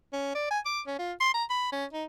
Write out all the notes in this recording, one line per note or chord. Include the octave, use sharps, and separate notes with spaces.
C#4
D5
G#5
D6
C#4
F4
C6
A#5
B5
C#4
D#4